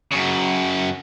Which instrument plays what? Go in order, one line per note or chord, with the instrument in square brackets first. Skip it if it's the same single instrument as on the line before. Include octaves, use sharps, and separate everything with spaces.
[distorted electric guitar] F#2 C#3